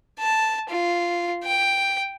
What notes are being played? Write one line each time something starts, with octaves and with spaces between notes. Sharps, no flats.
A5
F4
G5